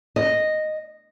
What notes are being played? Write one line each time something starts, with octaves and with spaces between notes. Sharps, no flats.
D#5